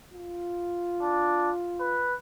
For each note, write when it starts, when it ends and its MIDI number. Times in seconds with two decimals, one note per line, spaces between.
0.14 2.09 65
1.02 1.50 62
1.80 2.15 71